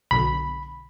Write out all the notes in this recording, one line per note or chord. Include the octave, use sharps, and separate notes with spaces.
B1 B2 D3 B5